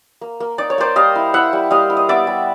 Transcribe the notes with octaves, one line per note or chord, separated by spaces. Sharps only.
A#3
A#3
D#4 D5
C#5
A#3 C5 D5
G3 D#5 F5
E4
E4 E5 F#5
G3
G3 D#5 F5
E4
D#5
B3 D5 E5
G3